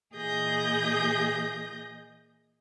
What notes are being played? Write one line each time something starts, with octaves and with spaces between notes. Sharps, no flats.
A#2 E3 G#4 D#5 G6 A#6